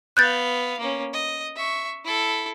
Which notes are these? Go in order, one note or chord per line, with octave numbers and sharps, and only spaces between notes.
B3 F5 F#6 G6 A6
A#3 C#4
D#5
E5 C#6
E4 A4